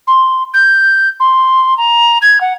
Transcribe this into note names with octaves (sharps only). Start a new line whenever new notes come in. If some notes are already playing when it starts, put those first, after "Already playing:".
C6
G6
C6
A#5
G#6
F#5